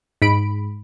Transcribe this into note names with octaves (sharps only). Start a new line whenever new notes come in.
G#2 B5 D7